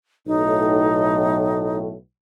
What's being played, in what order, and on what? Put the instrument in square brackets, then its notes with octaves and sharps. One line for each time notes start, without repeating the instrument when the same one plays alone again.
[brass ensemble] B1 A2 [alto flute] D#4